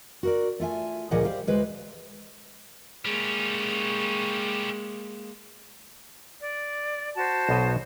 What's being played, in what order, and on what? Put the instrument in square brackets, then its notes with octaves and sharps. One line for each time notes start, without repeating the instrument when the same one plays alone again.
[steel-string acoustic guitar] F#4 A#4 D5
A3 F4 E5 G#5
D2 A#2 F3 G#4 D#5 F#5
G3 C5 F5
D2 G#3 B4 C5
[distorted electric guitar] G3 C#4 [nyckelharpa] G#3 A#3
[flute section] D5
F#4 C5 A5
[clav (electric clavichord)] B1 B2 D#5